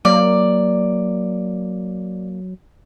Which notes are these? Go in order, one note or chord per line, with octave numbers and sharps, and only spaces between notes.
F#3 A#3 D5